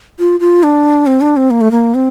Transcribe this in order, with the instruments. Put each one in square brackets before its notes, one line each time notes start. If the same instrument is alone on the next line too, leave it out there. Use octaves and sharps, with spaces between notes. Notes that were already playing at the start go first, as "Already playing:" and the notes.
[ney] F4
F4
D4
C4
D4
C4
A#3
A3
A#3
C4